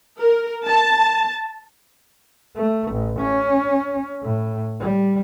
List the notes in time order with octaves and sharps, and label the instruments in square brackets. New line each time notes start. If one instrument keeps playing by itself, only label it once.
[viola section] A#4
A5
[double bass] A3
A1
C#4
A2
G3